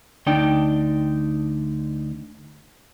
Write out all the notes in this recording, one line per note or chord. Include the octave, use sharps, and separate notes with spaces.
D2 D4 D#4 D5 G5